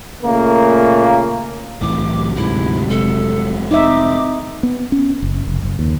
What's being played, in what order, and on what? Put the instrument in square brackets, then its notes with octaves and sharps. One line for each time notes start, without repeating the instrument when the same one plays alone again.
[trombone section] A#2 C#3 A3 A#3
[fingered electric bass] C2 A2 E3 [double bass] C3 F#3 [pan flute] D6
[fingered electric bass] D2 G#2 [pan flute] E4
[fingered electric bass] F1 G#3 [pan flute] A4
[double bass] C4 [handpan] D#4 E5 [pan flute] D6
[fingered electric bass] B3
C#4
F#1
F1
F#1
D#2